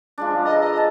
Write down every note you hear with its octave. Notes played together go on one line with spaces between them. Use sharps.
F3 G#3 D4
A4 B4 D#5 A#5
D#5
G#5 A5